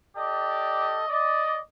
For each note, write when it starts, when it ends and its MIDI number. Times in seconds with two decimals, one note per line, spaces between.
0.16 1.04 67
0.16 1.04 69
0.16 1.04 74
0.16 1.04 75
1.09 1.59 74
1.09 1.59 75